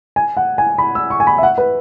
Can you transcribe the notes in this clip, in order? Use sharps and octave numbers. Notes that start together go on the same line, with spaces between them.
G#5
F#5
G#5
B5
E6
C#6
G#5
B5
E5
F#5
B4